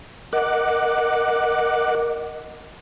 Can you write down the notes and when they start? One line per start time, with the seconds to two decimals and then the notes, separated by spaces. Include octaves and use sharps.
0.33 A#4 D#5 F#5 D6 F#6